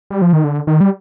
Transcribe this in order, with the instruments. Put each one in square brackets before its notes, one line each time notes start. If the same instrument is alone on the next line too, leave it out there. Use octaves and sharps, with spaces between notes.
[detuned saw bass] G3
F3
D#3
D3
D#3
G3